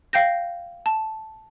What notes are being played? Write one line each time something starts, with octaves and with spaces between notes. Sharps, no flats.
F5 G5 G6 A#6
A5